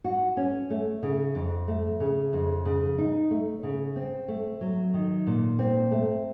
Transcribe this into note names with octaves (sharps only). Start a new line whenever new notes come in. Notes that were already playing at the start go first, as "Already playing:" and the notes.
F#4
C#4
A3
C#3
F2
A3
C#3
F2
C#3
D#4
A3
C#3
C4
A3
F#3
D#3
A#2
C4
A3